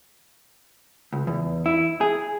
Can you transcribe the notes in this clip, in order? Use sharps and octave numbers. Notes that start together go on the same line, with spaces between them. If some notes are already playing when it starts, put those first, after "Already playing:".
C#2
E2
E4
G#4